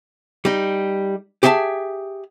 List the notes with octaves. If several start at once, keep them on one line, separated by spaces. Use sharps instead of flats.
G3 D#4
G4 G#4 E5 F#5 A5